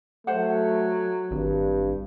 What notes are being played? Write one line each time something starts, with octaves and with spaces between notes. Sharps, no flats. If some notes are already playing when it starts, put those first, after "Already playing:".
F#3 A3 C5 F#5
G#1 G2